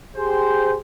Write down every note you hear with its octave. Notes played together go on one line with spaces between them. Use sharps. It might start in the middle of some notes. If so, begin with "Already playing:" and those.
G4 G#4 C5